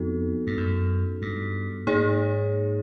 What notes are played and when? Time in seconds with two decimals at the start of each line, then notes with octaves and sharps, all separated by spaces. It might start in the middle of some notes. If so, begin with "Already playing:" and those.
Already playing: F2 B3 D#4 F#4 A4
0.47 G2
0.57 F#2
1.22 G2
1.87 G#2 A#3 D#4 G#4 C#5